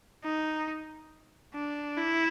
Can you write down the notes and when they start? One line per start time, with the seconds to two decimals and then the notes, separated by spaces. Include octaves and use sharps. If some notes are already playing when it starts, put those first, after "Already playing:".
0.24 D#4
1.55 D4
1.97 E4